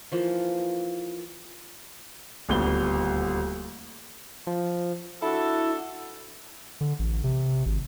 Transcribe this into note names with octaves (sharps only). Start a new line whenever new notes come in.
E3 F3 A#3
D#1 D2 B3 G7
F3
D4 E4 F#4 A4
D3
A1
C3
G#1